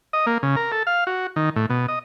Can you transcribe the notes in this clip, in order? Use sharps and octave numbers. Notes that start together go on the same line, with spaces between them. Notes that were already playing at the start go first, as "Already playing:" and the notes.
D#5
A#3
C#3
A#4
A4
F5
F#4
D#3
A2
B2
D#5